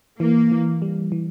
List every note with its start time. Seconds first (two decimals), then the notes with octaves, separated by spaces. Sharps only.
0.20 E3 A#3
0.51 E3
0.82 G3
1.12 E3